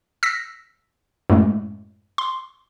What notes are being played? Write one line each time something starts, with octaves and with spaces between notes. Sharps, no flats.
E6 A#6 B6
F#2 A2 G#3 A3
C6